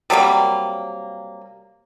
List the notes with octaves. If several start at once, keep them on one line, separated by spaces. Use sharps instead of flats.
C3 F#3 G3 A#3